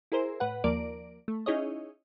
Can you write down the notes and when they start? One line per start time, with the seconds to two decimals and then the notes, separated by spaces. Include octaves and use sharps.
0.12 E4 G#4 A#4 C5
0.40 A2 B4 F#5
0.64 D#2 F3 A#3 A#4 D5 D7
1.28 A3
1.46 C#4 D#4 E4 G#4 C#5 D#5